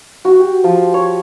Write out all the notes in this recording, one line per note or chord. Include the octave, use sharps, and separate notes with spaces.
F#4
G4
F3
C#5